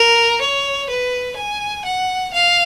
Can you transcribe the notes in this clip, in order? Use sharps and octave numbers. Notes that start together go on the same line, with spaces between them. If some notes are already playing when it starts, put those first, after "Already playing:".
Already playing: A#4
C#5
B4
G#5
F#5
F5